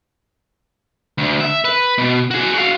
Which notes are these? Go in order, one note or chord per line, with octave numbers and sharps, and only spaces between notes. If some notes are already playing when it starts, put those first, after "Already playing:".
D2
E5
B4
B2
F#4 G#4
F#4 F5